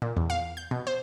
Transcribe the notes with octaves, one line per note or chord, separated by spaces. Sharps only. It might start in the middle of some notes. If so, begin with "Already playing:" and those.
A#2
E2
F5
G6
B2
C5